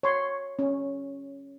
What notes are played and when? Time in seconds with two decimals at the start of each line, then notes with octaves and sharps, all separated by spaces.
0.03 C#5 C6
0.59 C#4